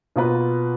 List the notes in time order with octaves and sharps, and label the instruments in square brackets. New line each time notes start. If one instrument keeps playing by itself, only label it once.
[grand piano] B2 A#3 F4 B4